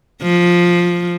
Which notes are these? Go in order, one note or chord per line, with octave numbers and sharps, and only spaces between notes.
F3